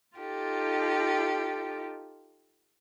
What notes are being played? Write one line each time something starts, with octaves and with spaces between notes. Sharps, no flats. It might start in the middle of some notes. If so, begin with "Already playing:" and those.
D#4 F4 G4 A4